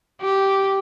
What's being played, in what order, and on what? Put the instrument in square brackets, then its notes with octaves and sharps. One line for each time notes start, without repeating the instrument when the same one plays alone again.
[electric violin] G4